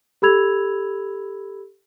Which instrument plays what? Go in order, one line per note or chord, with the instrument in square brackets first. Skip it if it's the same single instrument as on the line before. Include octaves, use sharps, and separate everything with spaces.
[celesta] G4 A4 B5 E6 G#6 F7